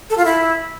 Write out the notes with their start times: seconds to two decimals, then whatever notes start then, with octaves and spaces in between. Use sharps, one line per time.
0.10 A4
0.17 F4
0.25 E4